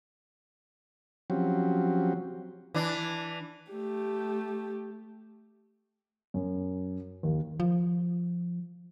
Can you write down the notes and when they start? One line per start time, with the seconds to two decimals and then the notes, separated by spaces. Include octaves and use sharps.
1.30 F3 F#3 C4 C#4 F#4 G4
2.74 E3 D4
3.72 A3 G4
6.34 F#2
7.23 D#2
7.60 F3